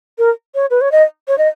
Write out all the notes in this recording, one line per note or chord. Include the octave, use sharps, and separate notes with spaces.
A#4
C#5
B4
C#5
D#5
C#5
D#5